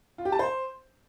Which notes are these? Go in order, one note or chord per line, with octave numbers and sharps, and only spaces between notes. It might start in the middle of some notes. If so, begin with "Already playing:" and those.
F4
G4
A5
C5